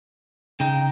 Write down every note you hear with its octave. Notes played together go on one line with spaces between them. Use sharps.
C#3 D#4 G5